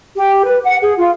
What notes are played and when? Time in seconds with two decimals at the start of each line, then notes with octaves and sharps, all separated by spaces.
0.15 G4
0.46 B4
0.62 F#5
0.81 G#4
0.97 F4